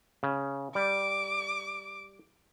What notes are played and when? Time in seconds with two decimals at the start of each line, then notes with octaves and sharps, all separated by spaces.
0.23 C#3
0.75 G3 D6